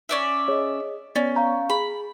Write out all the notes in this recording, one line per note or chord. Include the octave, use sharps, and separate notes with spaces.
C#4 D5 E5
G#4 C#5 D#5
B3 C#4 C#5 D5 A6
F5 A#5 C#6 G6
G#4 B5